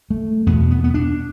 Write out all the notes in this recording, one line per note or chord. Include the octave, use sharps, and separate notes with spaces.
A3
E2 B2 B3
B3
B3
D4